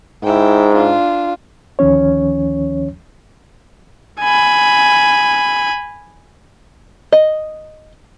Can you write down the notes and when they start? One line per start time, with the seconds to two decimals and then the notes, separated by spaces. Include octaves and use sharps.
0.24 G#2 E4 G5
0.74 D4 F4
1.79 D2 D#3 F3 C#4 C#5
4.21 G#5 B5
7.12 D#5